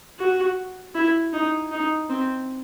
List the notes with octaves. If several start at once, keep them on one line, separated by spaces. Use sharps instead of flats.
F#4
E4
D#4
D#4
C4